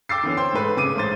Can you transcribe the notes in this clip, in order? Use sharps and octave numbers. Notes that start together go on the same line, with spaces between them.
G5 D6 E6 A6 C7
D3 E3 B3 C#4
C5 C#5 G5 C6
G#2 A3 B4
C#3 D6 D#7
A1 G#2 C5 A6